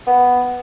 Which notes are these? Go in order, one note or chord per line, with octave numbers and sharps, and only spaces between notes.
B3